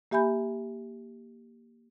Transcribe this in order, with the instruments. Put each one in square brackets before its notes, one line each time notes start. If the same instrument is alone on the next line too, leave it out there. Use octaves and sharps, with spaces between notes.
[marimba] A#3 G4 E5 G#5 B5 G6